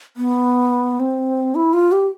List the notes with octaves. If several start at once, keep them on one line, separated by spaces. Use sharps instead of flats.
B3
C4
E4
F4
G4